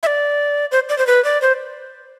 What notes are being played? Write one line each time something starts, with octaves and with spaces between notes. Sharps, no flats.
E5
D5
C5
D5
C5
B4
D5
C5